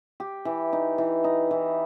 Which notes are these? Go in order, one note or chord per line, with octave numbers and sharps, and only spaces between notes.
G4
E3
D#4
E3
D#4
E3